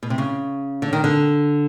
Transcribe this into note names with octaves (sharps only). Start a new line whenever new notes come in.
B2
C3
C#3
D3
D#3
D3